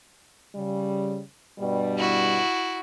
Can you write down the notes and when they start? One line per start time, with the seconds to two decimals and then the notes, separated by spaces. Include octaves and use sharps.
0.56 C#3 G3
1.59 G2 B2 G3
1.99 E4 F#4